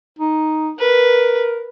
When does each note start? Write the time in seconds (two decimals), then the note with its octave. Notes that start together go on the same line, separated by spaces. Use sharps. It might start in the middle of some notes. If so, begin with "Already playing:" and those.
0.19 D#4
0.79 A#4 B4